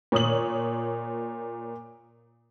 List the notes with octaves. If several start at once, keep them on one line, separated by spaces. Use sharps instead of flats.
A#2 C#5 D#6 F#7